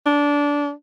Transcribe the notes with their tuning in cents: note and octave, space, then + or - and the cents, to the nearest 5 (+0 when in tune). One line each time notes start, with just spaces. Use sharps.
D4 -20